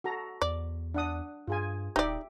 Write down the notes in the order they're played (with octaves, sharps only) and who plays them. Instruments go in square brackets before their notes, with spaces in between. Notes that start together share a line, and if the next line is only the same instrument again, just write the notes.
[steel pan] F#4 A4 A#5
[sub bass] E2 [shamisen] D5
[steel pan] D4 F#5 D#6
[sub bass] G2 [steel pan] F4 G#4 G#5
[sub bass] D#1 [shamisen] D#4 D5 [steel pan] G4 E5